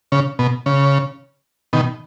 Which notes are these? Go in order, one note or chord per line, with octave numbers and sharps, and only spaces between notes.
C#3
B2
C#3
B2 D#3